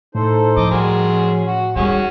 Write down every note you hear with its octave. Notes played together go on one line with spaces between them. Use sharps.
A2 D#4 A4 C5
F3 D#5 D6
G3 F#4 G#4 A#4 C6
F#3 C#4
F#4
D#3 F#3 G3 C#4 F#4 G#4